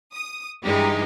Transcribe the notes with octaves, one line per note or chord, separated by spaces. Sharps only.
D#6
G2 E3 G#3 D#4 G4